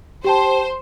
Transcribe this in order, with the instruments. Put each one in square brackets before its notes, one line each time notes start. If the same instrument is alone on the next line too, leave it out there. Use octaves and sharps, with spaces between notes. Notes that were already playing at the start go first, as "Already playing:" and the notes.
[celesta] G4 G5 A5 [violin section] C5